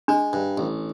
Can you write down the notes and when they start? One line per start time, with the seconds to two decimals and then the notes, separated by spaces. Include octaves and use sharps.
0.08 G#3 D4
0.33 G2
0.58 A1